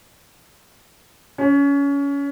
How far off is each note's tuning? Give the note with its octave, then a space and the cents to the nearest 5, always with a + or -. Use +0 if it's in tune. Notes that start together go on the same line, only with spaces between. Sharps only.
C#4 +25